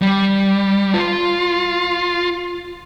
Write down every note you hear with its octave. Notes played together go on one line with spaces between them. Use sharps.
G3
F4